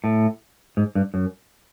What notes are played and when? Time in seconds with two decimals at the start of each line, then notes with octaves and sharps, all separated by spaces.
0.04 A2
0.77 G#2
0.95 G2
1.14 F#2